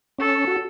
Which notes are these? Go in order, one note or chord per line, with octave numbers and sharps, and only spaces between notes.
C#4 A4
F#4